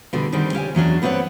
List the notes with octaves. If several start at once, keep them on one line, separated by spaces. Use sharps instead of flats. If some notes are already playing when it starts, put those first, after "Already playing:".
B2 D3 G3
D3 D#3 G3 C4
C#4 G4 F5 G#5
E2 F#3 C#4 D4
G2 B3 C4 C#5 F#5